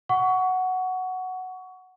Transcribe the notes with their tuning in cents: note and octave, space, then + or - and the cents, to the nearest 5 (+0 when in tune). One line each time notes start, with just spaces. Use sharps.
F#5 +0 C#6 +20